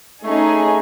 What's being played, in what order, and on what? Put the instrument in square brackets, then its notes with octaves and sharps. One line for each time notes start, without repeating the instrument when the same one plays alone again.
[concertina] A3 [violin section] C#4 D#4 G#4